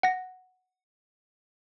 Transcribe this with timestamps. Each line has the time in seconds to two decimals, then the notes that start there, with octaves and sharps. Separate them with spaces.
0.03 F#5 A#6